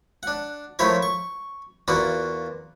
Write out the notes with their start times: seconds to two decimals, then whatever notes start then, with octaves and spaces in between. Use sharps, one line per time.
0.23 D4 F#5
0.79 F3 A3 E4 F4 A#4 C#5
1.03 C#6
1.88 E2 A#3 F4 F#4 D5